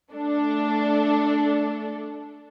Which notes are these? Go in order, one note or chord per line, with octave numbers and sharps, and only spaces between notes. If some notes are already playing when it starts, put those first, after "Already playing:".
A3 D4 A4